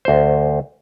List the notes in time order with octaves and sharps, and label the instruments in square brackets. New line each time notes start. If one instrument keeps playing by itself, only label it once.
[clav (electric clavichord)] D2 C5